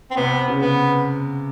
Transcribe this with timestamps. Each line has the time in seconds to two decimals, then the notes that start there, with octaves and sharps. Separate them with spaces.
0.11 C4
0.17 C3 B3
0.48 C#3
0.62 B3